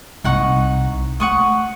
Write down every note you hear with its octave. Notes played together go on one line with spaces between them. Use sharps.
C2 D#4 F#5 C#6
A3 F#5 C#6 D#6